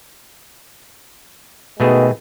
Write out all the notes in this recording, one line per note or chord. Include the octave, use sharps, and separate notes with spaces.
B2 D#3 G#3 A3 B3 G#4